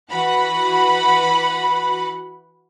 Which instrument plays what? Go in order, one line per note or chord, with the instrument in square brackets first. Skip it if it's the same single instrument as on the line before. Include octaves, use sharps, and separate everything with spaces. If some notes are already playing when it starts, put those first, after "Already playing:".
[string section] E3 F#4 B4 F#5 B5